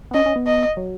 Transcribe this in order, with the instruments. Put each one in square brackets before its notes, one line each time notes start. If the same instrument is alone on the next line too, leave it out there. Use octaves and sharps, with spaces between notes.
[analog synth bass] B3
[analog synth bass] C#4 [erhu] D#5
[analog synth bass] C#4
B3
[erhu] D#5
[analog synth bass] F#3